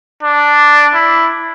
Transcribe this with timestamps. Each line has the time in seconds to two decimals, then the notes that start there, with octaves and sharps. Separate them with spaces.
0.23 D4
0.94 E4